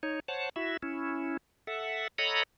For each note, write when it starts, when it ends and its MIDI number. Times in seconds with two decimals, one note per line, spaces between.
0.03 0.20 63
0.03 0.20 73
0.28 0.49 72
0.28 0.49 73
0.28 0.49 78
0.28 0.49 81
0.56 0.77 64
0.56 0.77 66
0.56 0.77 76
0.83 1.37 61
0.83 1.37 64
1.67 2.08 69
1.67 2.08 76
1.67 2.08 78
2.18 2.43 69
2.18 2.43 73
2.18 2.43 75
2.18 2.43 78
2.18 2.43 82
2.18 2.43 83